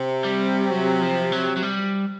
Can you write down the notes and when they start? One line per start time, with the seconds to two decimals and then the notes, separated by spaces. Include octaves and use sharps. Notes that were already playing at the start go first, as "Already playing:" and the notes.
Already playing: C3
0.24 G3
0.70 F#3
1.01 F3
1.32 F#3
1.57 F#3
1.63 G3